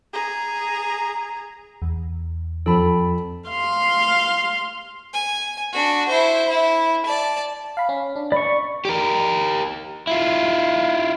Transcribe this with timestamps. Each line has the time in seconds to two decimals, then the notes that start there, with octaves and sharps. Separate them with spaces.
0.13 G#4 A#5
1.82 E2
2.66 F2 A4 A5 B5
3.49 F5 C6
5.13 G#5
5.73 D4 F#4
6.08 E4 C5
6.49 E4
7.05 D5 A5
7.77 F5 B5
7.89 C#4
8.16 D4
8.32 D5 B5 C#6
8.85 G4 A#4
10.07 E4 F4